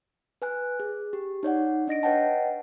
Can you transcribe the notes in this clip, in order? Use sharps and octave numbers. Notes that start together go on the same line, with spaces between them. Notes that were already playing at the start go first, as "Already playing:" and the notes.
B4 G#5 F#6
G#4
G4
D#4 C#5 D5 F#5
D4 D#5 A#6 D7
B4 C#5 D#5 F#5 G5 A5